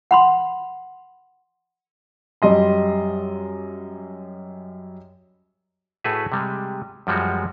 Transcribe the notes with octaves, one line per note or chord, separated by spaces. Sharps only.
F#5 B5 C6
F#2 G3 D#5 C6
A2 A3 F#4 G#4 B4 E5
C3 G3 G#3
F#2 F3 G3 G#3 F#4